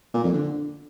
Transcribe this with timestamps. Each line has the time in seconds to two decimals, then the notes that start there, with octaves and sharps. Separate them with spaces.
0.14 A#2
0.24 F2
0.33 D3